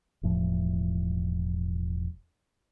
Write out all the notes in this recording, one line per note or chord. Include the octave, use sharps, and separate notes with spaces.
E1 A2 F3